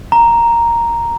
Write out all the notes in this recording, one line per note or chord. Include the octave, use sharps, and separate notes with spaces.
A#5